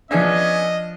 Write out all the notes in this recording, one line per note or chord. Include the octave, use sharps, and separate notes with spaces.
F3 B3 C#4 D4 G#4 D#5 E5